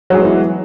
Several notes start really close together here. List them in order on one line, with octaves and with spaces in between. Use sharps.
F#3 G#4 G#3 B3 E3